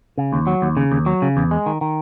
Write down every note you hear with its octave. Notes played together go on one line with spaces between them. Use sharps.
C#3
D#2
F#3
D#2
C#3
D#2
F#3
C#3
E2
G#3
D#3
D#3